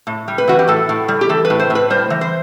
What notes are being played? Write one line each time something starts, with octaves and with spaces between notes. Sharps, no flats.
A2
G3
B4
E3 F#4
G4
A2 A4
A2
G3
G4
E3 A4
B4
A2
C5
A2
B4
G3 C5
E3
C5